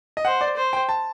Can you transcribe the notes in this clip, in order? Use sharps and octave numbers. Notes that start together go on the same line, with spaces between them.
D#5
C5 F#5
D5
C5
G5
A5